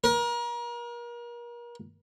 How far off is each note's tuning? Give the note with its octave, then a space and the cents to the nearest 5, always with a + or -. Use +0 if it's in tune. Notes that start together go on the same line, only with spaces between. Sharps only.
A#4 +35